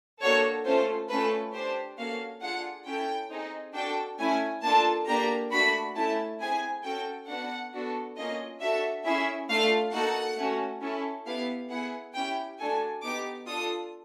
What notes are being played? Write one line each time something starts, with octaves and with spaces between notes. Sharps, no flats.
A#3 D4 F#4 A4 C#5
A3 C#4 F4 A4 C5
A3 C#4 F4 A4 B4
D4 G4 C5
A#3 C#4 F#4 A4 F5
D4 F4 G#4 F#5
C#4 E4 A4 G5
C4 D#4 G#4
D4 F#4 A4 G5
A3 C#4 E4 G#5
A#3 D4 F4 A4 A5
A#3 D4 G4 A#5
A3 D4 F#4 B5
A3 C#4 E4 A5
C4 E4 G#4 G#5
C#4 F#4 A4 G5
B3 D4 F#4 F#5
B3 D4 F#4 A4
A#3 C#4 F4 D#5
D4 F#4 A4 E5
C#4 E4 G#4 E5
A3 D4 F4 F5
A#3 D#4 F#4 A4 F#5
A3 C#4 F#4
C#4 E4 A4
B3 E4 G4 F5
B3 E4 G#4 F#5
C#4 E4 G4 G5
A3 D4 F#4 A4 G#5
B3 D#4 G4 D6
D4 F4 A4 D#6